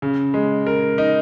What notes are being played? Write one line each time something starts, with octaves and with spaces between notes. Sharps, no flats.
C#3
G#3
A#4
D#4